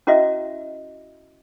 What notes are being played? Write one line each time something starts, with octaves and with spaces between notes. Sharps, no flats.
C#4 E4 F#4 D#5 E5